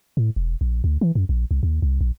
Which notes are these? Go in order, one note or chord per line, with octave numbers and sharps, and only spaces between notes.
A2
E1
A#1
D2
E3
F#2
A#1
C2
D#2
C2
A#1